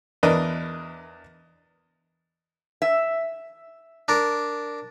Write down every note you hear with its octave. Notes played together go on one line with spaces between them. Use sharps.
E2 D4 A#4 B4 D#5 F#6
E5
D4 A#4